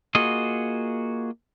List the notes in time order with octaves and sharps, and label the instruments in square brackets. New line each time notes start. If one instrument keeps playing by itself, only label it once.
[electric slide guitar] A#3 F4 F#4 G#4 D#5